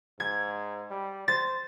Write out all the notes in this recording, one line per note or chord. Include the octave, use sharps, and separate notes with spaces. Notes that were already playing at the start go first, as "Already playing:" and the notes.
G#2 G#6
G3
C5 A6